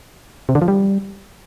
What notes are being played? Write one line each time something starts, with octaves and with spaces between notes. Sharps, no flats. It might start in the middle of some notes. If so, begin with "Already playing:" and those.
C3
D3
F3
G3